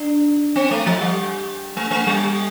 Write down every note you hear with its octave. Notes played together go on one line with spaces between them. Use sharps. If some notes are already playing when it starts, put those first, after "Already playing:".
Already playing: D4
C4
A3
F3
G3
A3
A3
G3